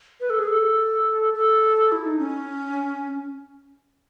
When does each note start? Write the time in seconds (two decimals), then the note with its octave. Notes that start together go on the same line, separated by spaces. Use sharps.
0.21 B4
0.30 A4
0.39 G#4
0.47 A4
1.34 A4
1.92 E4
2.05 D#4
2.19 C#4